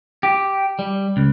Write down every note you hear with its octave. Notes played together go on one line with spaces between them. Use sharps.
G4
G3
C#2